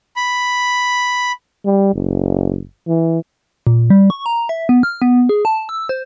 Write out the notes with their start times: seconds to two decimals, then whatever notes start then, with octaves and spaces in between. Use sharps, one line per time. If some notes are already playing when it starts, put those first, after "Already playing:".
0.16 B5
1.65 G3
1.95 F#1
2.87 E3
3.67 A#2
3.90 G3
4.10 C#6
4.26 A#5
4.49 E5
4.69 B3
4.83 F6
5.02 B3
5.29 G#4
5.45 A5
5.69 E6
5.89 C5